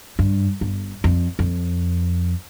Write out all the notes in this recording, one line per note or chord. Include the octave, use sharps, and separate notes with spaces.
G2
G1
F2
F2